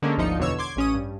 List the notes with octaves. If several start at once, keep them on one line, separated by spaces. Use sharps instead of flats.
D3 G#3 A#3 C#4
G#1 D2 F3 D#4 C#7
E2 B2 D3 C#5 E6
C6 D6 G#6
A1 C#4 D#6
G2